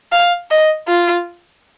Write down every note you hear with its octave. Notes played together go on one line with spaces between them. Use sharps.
F5
D#5
F4